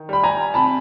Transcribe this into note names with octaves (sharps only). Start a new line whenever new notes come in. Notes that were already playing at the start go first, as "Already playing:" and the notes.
Already playing: D#3
G3 B5
G#5 A#5
C3 A5 B5